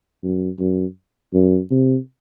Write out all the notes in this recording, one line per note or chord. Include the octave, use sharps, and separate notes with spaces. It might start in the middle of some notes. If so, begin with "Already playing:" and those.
F#2
F#2
F#2
C3